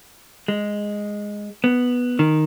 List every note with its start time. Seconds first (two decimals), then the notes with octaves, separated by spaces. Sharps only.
0.48 G#3
1.64 B3
2.19 D#3